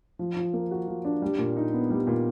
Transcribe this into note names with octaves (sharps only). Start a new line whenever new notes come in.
F3
F3
A#3
F#4
F3
D4
G3
A#2
D#4
B3
G3
A#2